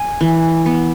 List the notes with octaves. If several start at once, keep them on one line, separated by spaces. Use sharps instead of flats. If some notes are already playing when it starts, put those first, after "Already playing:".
Already playing: G#5
E3
B3